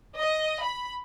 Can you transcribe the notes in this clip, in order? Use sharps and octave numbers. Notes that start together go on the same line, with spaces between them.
D#5
B5